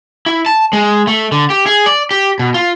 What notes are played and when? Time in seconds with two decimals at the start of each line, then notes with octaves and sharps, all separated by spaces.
0.26 E4
0.46 A5
0.73 G#3
1.07 A3
1.32 D3
1.50 G4
1.67 G#4
1.86 D5
2.11 G4
2.39 B2
2.54 F4